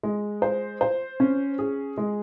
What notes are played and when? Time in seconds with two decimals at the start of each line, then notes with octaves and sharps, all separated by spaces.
0.03 G#3
0.42 C5
0.81 C5
1.20 C#4
1.59 G#4
1.98 G#3